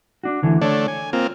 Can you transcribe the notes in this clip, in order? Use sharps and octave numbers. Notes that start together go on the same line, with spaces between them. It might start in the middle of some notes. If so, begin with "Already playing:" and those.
D4 F#4
D2 D3 E3
D3 A3 D4 C#5
G#5
A#3 C4 F4